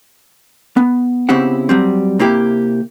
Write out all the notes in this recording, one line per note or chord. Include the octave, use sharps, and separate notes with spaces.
B3
C#3 B3 C4 E4 G4 F#5
F#3 G3 C4
C3 A#3 E4 G4